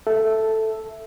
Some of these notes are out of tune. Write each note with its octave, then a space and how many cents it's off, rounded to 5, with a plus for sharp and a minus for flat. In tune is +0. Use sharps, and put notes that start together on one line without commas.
A4 +0 E5 +0